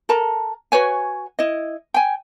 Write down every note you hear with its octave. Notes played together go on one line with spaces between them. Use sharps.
A4 A#4 A5 A#5
F#4 B4 C#5 G#5
E4 D#5
G5 G#5